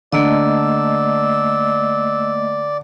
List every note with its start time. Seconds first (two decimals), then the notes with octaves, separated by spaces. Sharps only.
0.12 D3 A3 A#3 D5 D#5 E6